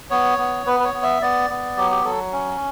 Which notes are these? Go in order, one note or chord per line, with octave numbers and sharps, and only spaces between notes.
B3 C#5
B3
B3 B4
B4
C#5
B3
E5
B3 D5
B3
F#3 G4
G4
F#3 A4
C#4